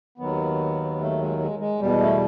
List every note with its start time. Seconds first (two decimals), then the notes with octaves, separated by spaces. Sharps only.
0.18 D#2 D#3 F#3 B3
0.99 A3
1.18 G#3
1.39 G#3
1.59 G#3
1.79 E2 B2 G3
1.99 A3